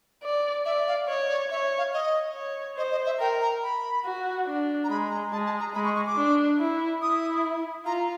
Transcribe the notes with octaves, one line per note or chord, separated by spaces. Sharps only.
D5
D5 E5
F5
C#5 D#5
D5
C#5 E5
F5
D#5
C#5
C5 D#5
D#5
E5
A#4 G5
A#5
B5
F#4
D4
A#5
G#3 B5
A#5
G#3 A5
A5
A#5
G#3 B5
C#6
C#6
D6
D4
E4
E4 D#6
F4 A#5